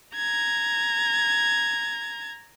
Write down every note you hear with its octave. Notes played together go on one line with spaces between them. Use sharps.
A#5 G#6